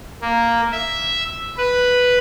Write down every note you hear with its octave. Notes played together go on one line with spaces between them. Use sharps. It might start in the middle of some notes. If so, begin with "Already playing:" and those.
A#3
E5
B4